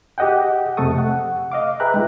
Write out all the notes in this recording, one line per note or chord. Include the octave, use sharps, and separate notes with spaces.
G4 G#4 D#5 F#5 G5
F2 C3 A3 A4 C#6 D#6
F#5
D#5 F5 D6
G#4 B4 E5 G5 A#5 F#6
G#3 D#4 F4